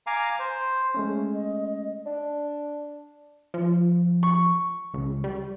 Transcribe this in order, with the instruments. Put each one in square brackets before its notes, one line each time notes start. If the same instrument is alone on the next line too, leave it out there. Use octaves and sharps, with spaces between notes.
[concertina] F5 G#5 A#5 D6
C5
[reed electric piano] G#3 A3 C#4
[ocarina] D#5
D#5
[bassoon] D4
[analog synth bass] F3
[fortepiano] C#6
[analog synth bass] C#2
G3